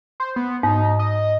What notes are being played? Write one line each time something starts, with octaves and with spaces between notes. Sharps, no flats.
C5
B3
G#2 D#4
D#5